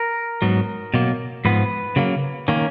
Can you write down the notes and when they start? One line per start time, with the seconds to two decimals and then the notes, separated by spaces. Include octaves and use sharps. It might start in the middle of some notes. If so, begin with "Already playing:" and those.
Already playing: A#4
0.42 G#2 F#3 B3
0.94 B2 F#3 A#3
1.45 G#2 F3 B3 B4
1.96 C#3 F#3 A#3
2.48 D#3 A#3 C#4